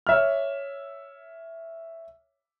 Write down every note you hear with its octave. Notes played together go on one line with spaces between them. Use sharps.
C#5 E5 F6